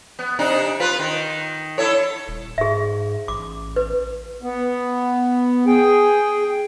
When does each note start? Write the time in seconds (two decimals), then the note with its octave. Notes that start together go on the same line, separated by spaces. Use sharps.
0.19 B3
0.39 C3 D4 D#4
0.80 F4 B4
1.00 D#3
1.78 E4 A4 C#5
2.28 D#1
2.58 G#2 G#4 E5
3.28 A1 D6
3.76 B4
4.42 B3
5.67 G#4 G5